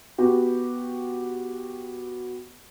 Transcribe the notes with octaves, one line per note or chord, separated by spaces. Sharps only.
B3 F#4 G4